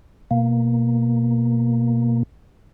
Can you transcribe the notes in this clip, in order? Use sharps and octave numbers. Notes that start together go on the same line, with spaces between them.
B2 A#3